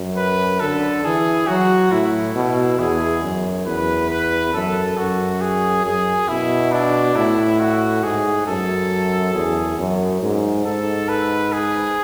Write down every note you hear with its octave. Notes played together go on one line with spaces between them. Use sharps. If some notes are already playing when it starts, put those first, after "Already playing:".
Already playing: F#2
B4
D3 A4
E3 G#4
F#3 F#4
A2 E4
B2
E2 G#4
F#2
E2 B4
B4
F#2 A4
F#2 F#4
G#4
F#2 G#4
B2 E4
D4
A2 E4
F#4
G#2 G#4
F#2 A4
E2 G#4
F#2
G#2
G#2 A4
B4
G#4